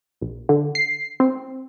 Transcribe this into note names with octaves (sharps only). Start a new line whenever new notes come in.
A#1
D3
C7
C4